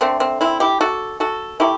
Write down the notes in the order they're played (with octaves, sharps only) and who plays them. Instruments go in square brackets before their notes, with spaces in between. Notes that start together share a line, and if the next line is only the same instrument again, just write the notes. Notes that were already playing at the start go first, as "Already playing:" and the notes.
[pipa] D3 A3 C4
C4
C4 E4
E4 G4
F#4 A4
F#4 A4
F#3 A3 E4 G4